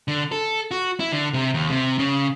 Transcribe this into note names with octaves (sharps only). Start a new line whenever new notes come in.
D3
A4
F#4
E4
D3
C3
D#2
C3
C#3